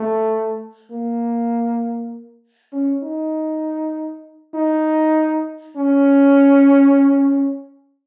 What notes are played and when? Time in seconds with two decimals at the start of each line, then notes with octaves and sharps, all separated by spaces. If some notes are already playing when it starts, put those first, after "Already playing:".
Already playing: A3
0.91 A#3
2.73 C#4
3.03 D#4
4.54 D#4
5.76 C#4